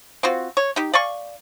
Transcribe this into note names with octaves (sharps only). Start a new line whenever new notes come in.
C4 F4 F#4
C#5
D#4 G4
D5 F5 G#5 C#6